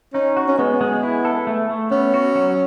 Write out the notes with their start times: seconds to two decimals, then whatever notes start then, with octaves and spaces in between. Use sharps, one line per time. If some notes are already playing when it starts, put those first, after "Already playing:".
0.14 C#4 D#4
0.37 F#4
0.48 C#4
0.58 G#3 B3
0.81 G#3
1.03 E4
1.25 A4
1.47 A3
1.69 A3
1.91 B3 C#4
2.14 F#4
2.35 F#3